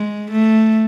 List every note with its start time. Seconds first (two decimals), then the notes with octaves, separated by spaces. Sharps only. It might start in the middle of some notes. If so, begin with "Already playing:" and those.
Already playing: G#3
0.31 A3